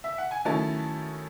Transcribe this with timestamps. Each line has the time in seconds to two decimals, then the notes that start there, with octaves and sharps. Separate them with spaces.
0.04 E5
0.18 F#5
0.31 G#5
0.45 D#3 F#3 A3 C#4 E4 A5